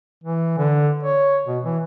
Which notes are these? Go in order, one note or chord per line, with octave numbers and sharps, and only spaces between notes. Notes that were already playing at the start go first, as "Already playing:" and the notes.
E3
D3
C#5
B2
E3